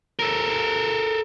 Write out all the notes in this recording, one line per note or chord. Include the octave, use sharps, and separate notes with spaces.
A4 A#4